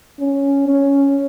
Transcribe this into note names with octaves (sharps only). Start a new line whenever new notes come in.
C#4
C#4